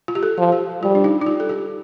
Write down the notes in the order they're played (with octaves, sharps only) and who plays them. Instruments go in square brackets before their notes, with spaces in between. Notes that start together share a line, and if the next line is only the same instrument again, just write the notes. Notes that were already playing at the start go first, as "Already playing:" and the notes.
[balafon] F4
G4
A4
[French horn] F3
[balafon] G4
[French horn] G3 [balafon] F4
[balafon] D4
D#4
D#4
F4
A4
G4